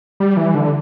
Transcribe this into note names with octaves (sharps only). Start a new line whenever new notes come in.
G3
E3
D3